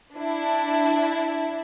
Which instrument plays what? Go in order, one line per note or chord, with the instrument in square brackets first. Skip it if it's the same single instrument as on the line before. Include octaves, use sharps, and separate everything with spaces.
[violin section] D4 E4